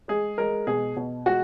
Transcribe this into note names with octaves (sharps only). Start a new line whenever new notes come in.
G#3 G#4
G#3 A#4
B2 G#4
B2
G#3 F#4